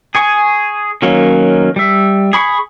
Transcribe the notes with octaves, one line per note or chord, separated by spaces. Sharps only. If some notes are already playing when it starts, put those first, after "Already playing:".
G#4 G#5 C#6
D#3 F#3 A#3 C#4
G3 E5
G#4 B5 C#6